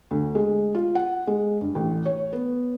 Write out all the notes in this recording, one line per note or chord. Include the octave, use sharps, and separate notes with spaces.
D2
G#3
F4
F#5
G#3
G2
A1
C#5
B3